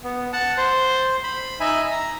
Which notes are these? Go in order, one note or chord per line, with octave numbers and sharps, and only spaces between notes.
B3
F#5 A5
C5
B5
D#4 E5 G#5 B5
A#5